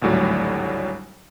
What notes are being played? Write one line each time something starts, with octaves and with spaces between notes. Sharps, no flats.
G#1 D2 A2 F#3 G3